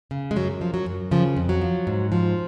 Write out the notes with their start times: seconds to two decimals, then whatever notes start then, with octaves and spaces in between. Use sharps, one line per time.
0.11 C#3
0.31 G#3
0.36 F#2 F#3
0.61 F3
0.74 F#3
0.86 F#2
1.11 C#3 F3
1.37 F2
1.49 F#3
1.61 F3
1.87 G#2
2.12 F3